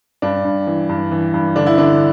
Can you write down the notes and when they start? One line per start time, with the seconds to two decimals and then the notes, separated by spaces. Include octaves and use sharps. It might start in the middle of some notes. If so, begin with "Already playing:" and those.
0.22 G2 D4
0.45 G2
0.67 E3
0.89 G2
1.11 E3
1.34 G2
1.56 D3 D4
1.66 E4
1.78 D3 D4